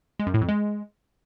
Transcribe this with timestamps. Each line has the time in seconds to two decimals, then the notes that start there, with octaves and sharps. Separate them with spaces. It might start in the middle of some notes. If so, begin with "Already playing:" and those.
0.19 G#3
0.27 F#2
0.34 A2
0.41 F2
0.49 G#3